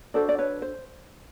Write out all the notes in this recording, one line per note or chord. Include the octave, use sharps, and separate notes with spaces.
D4 F#4 A4 C5 D5
D5
B4 C#5
C5